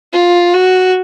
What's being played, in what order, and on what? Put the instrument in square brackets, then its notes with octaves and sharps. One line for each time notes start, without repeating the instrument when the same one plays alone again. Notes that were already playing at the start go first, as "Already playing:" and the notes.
[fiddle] F4
F#4